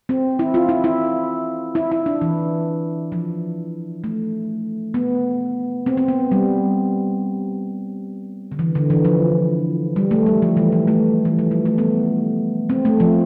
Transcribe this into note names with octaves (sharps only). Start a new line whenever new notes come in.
C4
E4
F4
E4
E4
E4
E4
D4
E3
F3
A3
B3
C4
C4
B3
G3
D3
E3
D3
E3
F3
G3
A3
G3
F3
E3
E3
A3
E3
F3
G3
A3
B3
C4
A3
F3